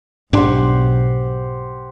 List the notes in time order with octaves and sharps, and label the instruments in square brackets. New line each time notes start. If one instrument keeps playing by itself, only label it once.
[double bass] B1 [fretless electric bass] G#2 D4 [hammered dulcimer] G4 C5 F#5